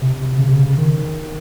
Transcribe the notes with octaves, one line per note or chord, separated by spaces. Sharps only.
C3
C#3
C3
C#3
D#3